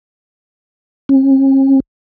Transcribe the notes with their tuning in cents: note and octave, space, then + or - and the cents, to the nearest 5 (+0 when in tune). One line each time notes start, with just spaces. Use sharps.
C#4 -45